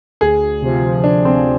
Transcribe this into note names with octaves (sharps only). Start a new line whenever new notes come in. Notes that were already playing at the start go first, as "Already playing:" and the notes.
D2 G#4
C3 F3
D2 D4
C4